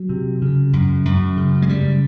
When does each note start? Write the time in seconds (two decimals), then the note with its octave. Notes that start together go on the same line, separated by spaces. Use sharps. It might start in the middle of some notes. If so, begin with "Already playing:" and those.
Already playing: F#3
0.09 C3
0.42 C#3
0.73 F#2
1.05 F#2
1.37 C#3
1.62 G#3
1.69 C#3 G3